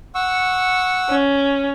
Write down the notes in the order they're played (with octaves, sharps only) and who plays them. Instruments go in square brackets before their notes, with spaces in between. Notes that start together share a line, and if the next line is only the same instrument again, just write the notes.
[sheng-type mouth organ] F#5 C#6 E6
[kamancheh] C#4